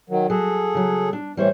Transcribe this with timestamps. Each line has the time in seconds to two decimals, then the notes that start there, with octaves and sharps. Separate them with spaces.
0.10 D#3 F#3
0.30 F#3 G#4 A4
0.75 C#3 F#3
1.13 D4
1.37 A2 E3 G3 C5 C#5